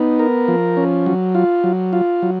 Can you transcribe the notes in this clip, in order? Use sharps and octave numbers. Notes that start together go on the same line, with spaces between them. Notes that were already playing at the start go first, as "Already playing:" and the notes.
Already playing: B3 D#4
A#4
F3
C#4
F#3
F4
F#3
F4
F#3